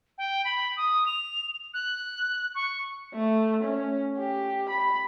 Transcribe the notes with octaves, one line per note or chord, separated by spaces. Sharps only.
G5
B5
D#6
F7
F#6
C#6
A3
C#4
G4
B5